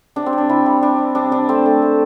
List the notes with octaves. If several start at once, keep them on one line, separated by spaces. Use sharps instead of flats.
C3 D4
C4
C3
D4
C3 E4
G3
G3 D4
C3
C3 D4
C3 D4
A3 C4
A3
A3